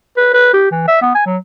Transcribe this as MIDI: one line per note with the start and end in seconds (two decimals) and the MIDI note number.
0.17 0.31 71
0.34 0.51 71
0.53 0.70 67
0.71 0.88 52
0.88 0.98 76
1.02 1.14 59
1.15 1.22 80
1.26 1.37 54